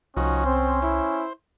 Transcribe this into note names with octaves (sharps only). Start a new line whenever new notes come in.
C2 F3 C#4 D#4 F#4
C4 C5
E4